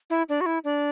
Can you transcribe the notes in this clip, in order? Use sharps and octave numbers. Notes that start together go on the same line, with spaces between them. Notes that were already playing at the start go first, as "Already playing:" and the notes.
E4
D4
F#4
E4
D4